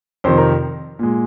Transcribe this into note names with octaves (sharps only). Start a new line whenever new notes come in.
F2 C3 D#3 C5
A#4
A#2 G#3